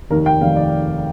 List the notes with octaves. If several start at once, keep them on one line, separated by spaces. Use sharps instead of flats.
F1 D#2 D#3 A#4
G5
F1 D#2 D#3 F5
D5